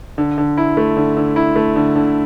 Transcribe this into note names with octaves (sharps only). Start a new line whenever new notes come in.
D3
D3
E4
A3
D3
D3
E4
A3
D3
D3